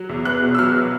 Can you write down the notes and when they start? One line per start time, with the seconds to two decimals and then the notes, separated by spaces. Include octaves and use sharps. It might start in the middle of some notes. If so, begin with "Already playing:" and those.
Already playing: F#3
0.09 E2
0.25 B3 F#6
0.42 B2
0.55 E6
0.59 F#3 F6